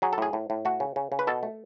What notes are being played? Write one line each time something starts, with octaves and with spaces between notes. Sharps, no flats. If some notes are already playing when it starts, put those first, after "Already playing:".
F#3 G#4
A4
A2 G#4
A2
A2
A3 F#4
C#3
C#3
C#3
B4
B2 A4
A3